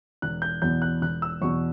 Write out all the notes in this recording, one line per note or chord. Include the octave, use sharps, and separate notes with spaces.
E1 F#6
G6
E2 B2 G6
F#6
E1 F#6
E6
E2 B2 C#6